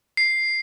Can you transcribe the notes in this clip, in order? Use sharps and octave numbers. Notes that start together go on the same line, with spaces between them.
C7